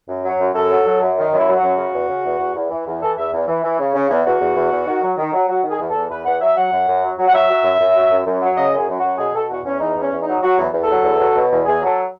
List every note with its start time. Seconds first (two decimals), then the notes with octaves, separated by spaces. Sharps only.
0.09 F#2
0.24 F#3
0.40 F#2
0.54 F#2 A4
0.70 F#3
0.85 F#3
1.01 F#2
1.17 D#3
1.32 F#2
1.37 E4
1.47 F#3
1.57 F#4
1.63 F#2
1.78 C#3
1.93 E2
2.08 C#3
2.24 E2
2.39 E2
2.55 E2
2.70 E3
2.86 E2
3.01 E3 A4
3.17 E2 E5
3.33 E2
3.47 E3
3.63 E3
3.79 C#3
3.95 C#3
4.10 E2
4.25 E2 F#4
4.40 E2
4.56 E2
4.72 E2
4.87 D#3
5.02 F#3
5.17 D#3
5.33 F#3
5.48 F#3 F#4
5.63 D#3
5.69 G#4
5.79 E2
5.89 A4
5.95 E2
6.10 E2 B4
6.25 E2 F#5
6.41 F#3 E5
6.56 F#3 F#5
6.72 F#2
6.88 F#2
7.03 F#3
7.19 F#3
7.27 F#5
7.33 F#3 E5
7.49 F#3
7.64 F#2
7.80 F#2
7.95 F#3
8.11 F#2
8.25 F#2
8.41 F#3
8.56 C#3 D#5
8.72 F#2
8.77 G#4
8.88 F#2
8.98 F#4
9.04 F#2
9.18 B2 G#4
9.34 B2 A4
9.49 E2 F#4
9.64 E2 C#4
9.80 E2 D#4
9.96 E2
10.01 C#4
10.12 E2
10.22 D#4
10.27 F#3
10.42 F#3 F#4
10.58 E2
10.73 E2
10.83 A4
10.89 F#3
11.03 E2
11.19 F#3
11.35 B2
11.50 E2
11.65 E2 G#4
11.81 F#3
11.86 A4